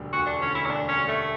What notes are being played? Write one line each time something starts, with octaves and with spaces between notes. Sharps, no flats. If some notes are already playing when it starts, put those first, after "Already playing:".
Already playing: E1 D2 D3 G3
D2 F#4
D4
D3 C#4
E4
C#4
E1 D4
C#4
G3
A3